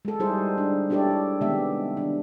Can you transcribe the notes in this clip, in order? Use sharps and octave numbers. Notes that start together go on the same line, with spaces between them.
G#3 A4
G3 D#4 E4 G#4 C5
D4
D4 E4 G4 A4 C#5 D5
C3 D#3 G#3 B3 G4 E5
D#3 D4